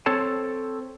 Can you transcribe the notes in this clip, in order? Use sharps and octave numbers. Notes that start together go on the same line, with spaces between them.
C4 A4 C#5 A5